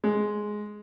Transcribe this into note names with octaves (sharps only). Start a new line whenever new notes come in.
G#3